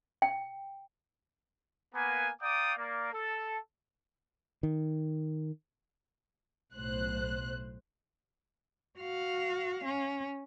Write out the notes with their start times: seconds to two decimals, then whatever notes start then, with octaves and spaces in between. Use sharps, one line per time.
0.22 G5
1.95 A#3 B3 G#5
2.42 D5 F5 G5 A#5 D6 D#6
2.78 A#3 D5
3.14 A4
4.63 D#3
6.74 B1 A2 C5 F#6
8.99 F#4 F5
9.85 C#4